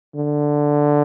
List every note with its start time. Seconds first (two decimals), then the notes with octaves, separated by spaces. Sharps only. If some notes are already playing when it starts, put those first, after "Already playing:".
0.15 D3